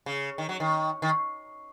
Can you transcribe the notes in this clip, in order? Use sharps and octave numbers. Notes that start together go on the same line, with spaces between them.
C#3
D#3
F#3
D#3
D#3